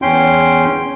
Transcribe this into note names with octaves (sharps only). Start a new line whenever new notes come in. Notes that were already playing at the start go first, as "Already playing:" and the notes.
E2 C#4 G5 C6